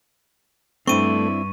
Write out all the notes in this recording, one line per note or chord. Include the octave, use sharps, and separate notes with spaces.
G2 A3 C4 D4 E4 C#6 D#7